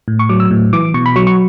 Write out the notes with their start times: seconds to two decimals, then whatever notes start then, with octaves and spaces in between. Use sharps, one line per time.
0.08 A2
0.19 C#6
0.29 F#3 D6
0.40 E6
0.51 A2
0.73 E3 D6
0.94 B2 C#6
1.06 B5
1.16 F#3 C#6
1.27 C#6